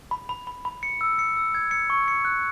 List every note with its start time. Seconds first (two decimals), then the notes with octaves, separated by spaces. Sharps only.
0.11 B5
0.29 B5
0.47 B5
0.65 B5
0.83 C#7
1.01 E6
1.19 C#7
1.36 E6
1.55 G#6
1.71 C#7
1.90 C#6
2.08 C#7
2.25 F#6